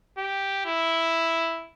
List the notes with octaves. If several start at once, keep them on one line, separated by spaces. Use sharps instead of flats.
G4
E4